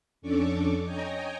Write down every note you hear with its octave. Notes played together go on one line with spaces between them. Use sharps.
F2 C#4 D4 A4 C#6 D6
C#5 D#5 G5 G#5 A#5